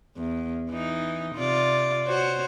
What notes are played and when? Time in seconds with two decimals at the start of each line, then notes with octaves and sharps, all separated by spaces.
0.17 E2
0.70 E3 D#4
1.36 C3 F4 D5
2.08 F#4 C5 C#5